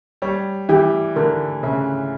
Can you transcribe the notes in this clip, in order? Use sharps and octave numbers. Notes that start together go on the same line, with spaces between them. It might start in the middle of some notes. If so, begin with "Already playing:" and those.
G3 C#5
E3 G4
D3 A#4
C#3 E5